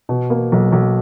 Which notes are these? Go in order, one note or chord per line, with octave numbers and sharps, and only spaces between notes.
B2
A#3
B1
B1